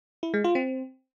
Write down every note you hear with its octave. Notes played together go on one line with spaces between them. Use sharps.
E4
G#3
F4
C4